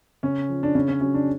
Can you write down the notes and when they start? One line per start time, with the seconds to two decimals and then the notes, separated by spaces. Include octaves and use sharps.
0.23 C#3 C#4
0.49 F3
0.63 D4
0.75 C#3 C#4
0.88 C#4
1.01 F#3 C#4
1.14 D4